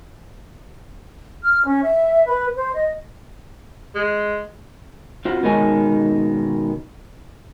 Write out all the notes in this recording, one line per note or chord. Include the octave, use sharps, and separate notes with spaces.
F6
C#4
E5
B4
C5
D#5
G#3
C4 F4 F#4
B2 D#3 G#3 D#4 C#5 G#5